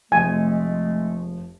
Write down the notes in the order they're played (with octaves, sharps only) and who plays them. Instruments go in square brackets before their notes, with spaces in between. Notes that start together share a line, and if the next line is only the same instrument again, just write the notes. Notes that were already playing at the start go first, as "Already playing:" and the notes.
[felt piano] F1 F3 [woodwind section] G#3 A3 [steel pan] G#5